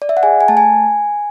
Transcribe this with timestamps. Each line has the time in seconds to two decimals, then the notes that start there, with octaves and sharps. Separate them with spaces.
0.02 D5
0.09 E5
0.17 F#5
0.23 G#4 G#5
0.41 G#5
0.48 A3 A5
0.57 G#5